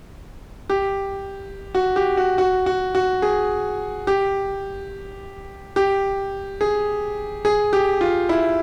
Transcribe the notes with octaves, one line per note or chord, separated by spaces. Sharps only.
G4
F#4
G4
F#4
F#4
F#4
F#4
G#4
G4
G4
G#4
G#4
G4
F4
E4